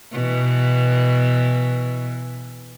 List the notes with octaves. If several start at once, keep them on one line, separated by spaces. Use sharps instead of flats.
B2 E3